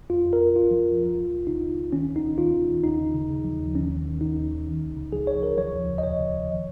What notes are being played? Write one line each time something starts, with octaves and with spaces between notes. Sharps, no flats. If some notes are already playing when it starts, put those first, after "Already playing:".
F2 F4
F2
A#4
F2
F2 F4
F3
F2
C#2
C#2
C#2
C#3 D#4
C#3
C#2
D#3 C#4
D#2
D#4
D#3
D#3 F4
D#3
D#3
D#2 D#4
C#3
C#3
C#3
F3
D#2
D#2 C#4
D#3
D#3
D#3 D#4
D#2
D#3
C#2
C#2
C#3
F3 G#4
C#2 C#5
C#2 A#4
F3 C#5
D#2
C#3
D#5
D#2 C#5
C#3
C#3
D#3